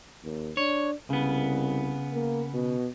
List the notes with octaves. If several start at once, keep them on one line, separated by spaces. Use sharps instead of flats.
D#2
D4 C#5
C2 C#3 B3
A#3
B2